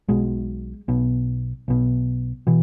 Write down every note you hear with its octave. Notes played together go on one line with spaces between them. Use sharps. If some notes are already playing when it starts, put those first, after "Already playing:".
B1 B2 G#3
B1 B2
B1 B2
B2 E3